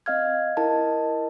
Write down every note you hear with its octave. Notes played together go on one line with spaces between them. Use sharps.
C4 D#5 F5 F6 G#6
E4 A#4 D#5 A5